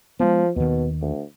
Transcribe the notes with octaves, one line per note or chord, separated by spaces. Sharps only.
F3 G#3 B3
D#2 B2 D#3
D2